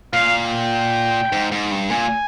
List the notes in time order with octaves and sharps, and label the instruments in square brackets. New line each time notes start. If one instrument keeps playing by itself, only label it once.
[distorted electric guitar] A#2 [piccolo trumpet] F5
[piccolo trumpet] G5
[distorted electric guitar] G#2
G#2
G2
[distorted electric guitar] A#2 [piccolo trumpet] G#5